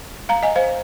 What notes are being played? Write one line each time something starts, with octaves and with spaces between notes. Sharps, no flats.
F5 A#5
D#5 G#5
C5 F5